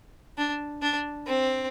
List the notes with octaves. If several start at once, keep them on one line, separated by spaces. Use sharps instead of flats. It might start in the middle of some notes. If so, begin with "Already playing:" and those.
D4
D4
C4